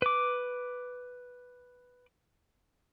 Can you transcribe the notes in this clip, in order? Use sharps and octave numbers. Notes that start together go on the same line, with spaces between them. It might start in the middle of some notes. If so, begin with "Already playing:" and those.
B4 D6